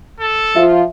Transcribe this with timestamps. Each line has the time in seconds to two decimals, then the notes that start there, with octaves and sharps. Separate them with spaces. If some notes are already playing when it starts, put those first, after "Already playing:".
0.20 A4
0.56 F3 F4 E5